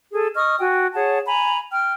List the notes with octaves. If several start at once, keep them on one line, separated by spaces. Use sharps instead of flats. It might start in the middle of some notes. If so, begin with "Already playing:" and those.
G#4 A4
D#5 C#6 D#6 F6
F#4 G5 G#5
G#4 C#5 F#5 A5
G#5 A#5 B5
G5 F6